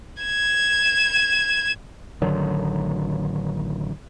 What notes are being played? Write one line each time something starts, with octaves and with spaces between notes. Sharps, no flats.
G#6 E7
A1 D3 D#3 F#3